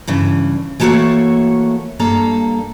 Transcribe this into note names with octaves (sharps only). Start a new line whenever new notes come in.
G2 C#3 E3
E3 A3 A#3 F#4 A4 C#5
G2 A#3 A4 A#5